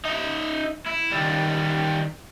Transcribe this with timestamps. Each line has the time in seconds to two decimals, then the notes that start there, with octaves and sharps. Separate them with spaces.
0.05 D#4 E5
0.86 E4
1.12 D#3 G3